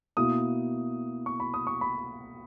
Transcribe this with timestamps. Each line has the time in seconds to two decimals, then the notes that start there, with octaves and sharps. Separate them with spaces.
0.17 B2 A#3 E4 D#6
1.26 C#6
1.40 B5
1.54 D#6
1.67 C#6
1.81 B5